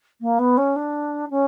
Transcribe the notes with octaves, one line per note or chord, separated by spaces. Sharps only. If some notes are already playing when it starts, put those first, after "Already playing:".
A#3
B3
C#4
D4
C#4